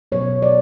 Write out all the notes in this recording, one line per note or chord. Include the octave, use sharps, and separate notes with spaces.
B2 F#3 B3 C#5
D5